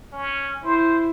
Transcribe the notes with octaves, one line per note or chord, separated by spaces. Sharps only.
C#4
E4 C5